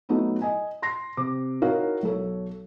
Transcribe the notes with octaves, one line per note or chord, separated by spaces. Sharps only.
F#3 A3 B3 D#4 E4
D#5 G#5
C6 A#6 C7
C3 D6
D#4 E4 F#4 A#4 C#5 F5
B1 A4 C#5